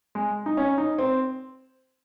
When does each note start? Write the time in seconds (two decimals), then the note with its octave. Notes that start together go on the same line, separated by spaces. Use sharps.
0.15 G#3
0.46 D#4
0.57 C#4
0.78 D#4
0.98 C4